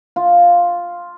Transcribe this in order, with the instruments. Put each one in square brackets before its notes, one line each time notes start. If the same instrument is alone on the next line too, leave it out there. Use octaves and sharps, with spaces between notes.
[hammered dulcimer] F4